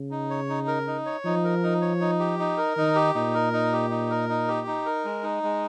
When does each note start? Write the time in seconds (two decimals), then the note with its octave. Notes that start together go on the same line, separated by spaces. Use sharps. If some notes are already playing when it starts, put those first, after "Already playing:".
Already playing: C#3
0.11 D#4
0.30 C#5
0.49 D#4
0.68 A#4
0.87 D#4
1.06 C#5
1.25 F3 D#4
1.44 A#4
1.63 D#4
1.81 C#5
2.01 D#4
2.19 G4
2.39 D#4
2.57 A#4
2.77 D#3 D#4
2.95 G4
3.15 A#2 D#4
3.34 A#4
3.53 D#4
3.72 G4
3.90 D#4
4.10 A#4
4.29 D#4
4.48 G4
4.67 D#4
4.86 A#4
5.05 G#3
5.23 D#4
5.43 G#3